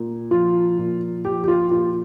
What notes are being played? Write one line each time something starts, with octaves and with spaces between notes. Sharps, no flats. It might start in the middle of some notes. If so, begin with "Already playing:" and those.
Already playing: A#2
F3 F4
A#2
F3 G4
G4
F4
A#2 F4